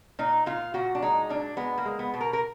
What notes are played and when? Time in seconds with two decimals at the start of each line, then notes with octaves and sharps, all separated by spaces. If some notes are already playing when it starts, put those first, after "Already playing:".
0.19 A#2 D#4
0.46 A#2 F4
0.74 A#2 F#4
0.95 D4
1.02 G#3 D#4
1.29 A#2 D4
1.57 G#3 B3
1.78 A#3
1.85 G#3
1.99 B3
2.14 B2
2.21 A#4
2.33 A#4